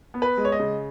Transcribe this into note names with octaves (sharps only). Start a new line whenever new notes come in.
B3
B4
G#3
C#5
D#5
C#3